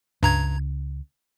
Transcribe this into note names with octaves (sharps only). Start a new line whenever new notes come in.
C#2 G2 A#5 G#6